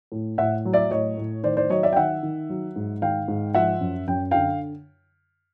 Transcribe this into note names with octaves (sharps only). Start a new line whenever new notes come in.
A2
A2 E5 F#5
F#3
D5 E5
A2 C#5 D#5
A2
D#3 C5 D5
C5 D5
F#3 C#5 D#5
D5 E5
G5
D#3 E5 F#5
D#3
F#3
G#2
D#3 F5 G5
G#2
F3 E5 F#5
F#2
F#2 G5
D3 F5 G5